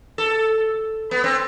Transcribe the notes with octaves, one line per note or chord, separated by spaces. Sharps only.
A4
B3
C4